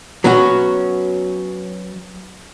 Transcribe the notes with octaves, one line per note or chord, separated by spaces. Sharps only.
F#3 B3 C#4 F#4